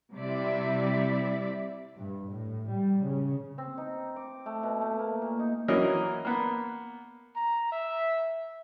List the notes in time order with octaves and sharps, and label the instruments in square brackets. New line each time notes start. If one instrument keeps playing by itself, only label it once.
[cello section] C3 G3 C4 E4 D5 E5
[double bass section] G2
A2
G3
C#3
[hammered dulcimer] C4
D#4
D6
A3
B2
A3
A#3
A#2
D#4
[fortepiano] E3 F#3 A#3 C#4 A#4 D#5
A#3 B3
[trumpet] A#5
E5